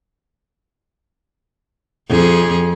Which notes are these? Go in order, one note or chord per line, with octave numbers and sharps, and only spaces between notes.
F2 G#4